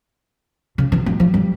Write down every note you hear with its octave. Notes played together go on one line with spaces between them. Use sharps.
C#3
E3
G#3
F3
G3